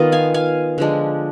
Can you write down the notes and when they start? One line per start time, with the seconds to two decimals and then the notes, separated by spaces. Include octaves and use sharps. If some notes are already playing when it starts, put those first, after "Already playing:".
Already playing: D#3 B3 F4 D#5
0.12 F5 G#5
0.34 F5 G#5
0.78 D3 F3 G#3 D4